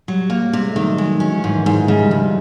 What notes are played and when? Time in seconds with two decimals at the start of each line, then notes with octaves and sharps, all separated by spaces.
0.08 F#3 G3
0.30 A#3
0.46 G3
0.53 C3 G#3
0.67 A3
0.76 D#3
0.82 F#3
0.98 F#3 G#3
1.13 F#3
1.20 C#4
1.28 E3
1.44 G#2 E3
1.52 D#3
1.59 E3
1.66 G#2
1.74 F3
1.88 C#3 G#3
2.00 G3
2.11 F2 F#3
2.22 G3